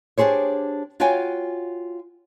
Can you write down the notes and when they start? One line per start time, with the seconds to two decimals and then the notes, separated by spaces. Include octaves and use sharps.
0.18 D4 G4 G#4 C5 C#5
1.00 F4 F#4 C#5 F5 G5 G#5